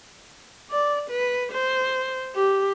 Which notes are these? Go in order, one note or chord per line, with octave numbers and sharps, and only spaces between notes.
D5
B4
C5
G4